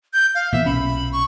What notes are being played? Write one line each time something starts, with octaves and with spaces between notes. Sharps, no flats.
G6
F5
A#2 E3 B3 E5
B1 A#2 C#4 B5
C#6